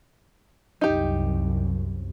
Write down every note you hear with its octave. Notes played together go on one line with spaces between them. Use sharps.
C2 F#2 D#4 G4